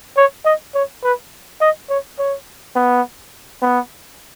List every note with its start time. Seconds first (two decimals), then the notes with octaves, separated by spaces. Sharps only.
0.17 C#5
0.45 D#5
0.75 C#5
1.04 B4
1.61 D#5
1.90 C#5
2.18 C#5
2.75 B3
3.62 B3